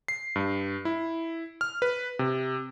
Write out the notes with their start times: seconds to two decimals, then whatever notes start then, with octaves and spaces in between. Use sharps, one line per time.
0.08 C7
0.36 G2
0.85 E4
1.61 F6
1.82 B4
2.19 C3